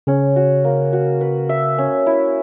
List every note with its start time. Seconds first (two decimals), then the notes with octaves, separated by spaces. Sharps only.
0.07 C#3 C#4
0.36 F#4
0.64 A#3
0.93 F#4
1.21 B4
1.49 E5
1.78 C#4
2.06 E4